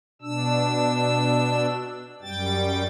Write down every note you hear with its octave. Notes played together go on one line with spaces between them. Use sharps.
B2 D4 E6
F#2 G3 G5 A6